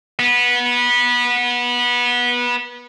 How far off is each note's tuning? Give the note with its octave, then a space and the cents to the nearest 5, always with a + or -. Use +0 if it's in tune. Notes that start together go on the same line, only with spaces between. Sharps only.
B3 -20